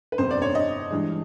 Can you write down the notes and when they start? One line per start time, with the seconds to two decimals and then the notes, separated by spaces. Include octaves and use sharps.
0.12 B4
0.18 G1 F2 C3 C5
0.31 D5
0.42 C#5
0.55 D#5
0.91 G2 E3 G#3